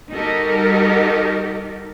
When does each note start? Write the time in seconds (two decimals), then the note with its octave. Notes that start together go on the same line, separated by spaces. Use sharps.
0.13 G3 D#4 F#4 G4 A4 A#4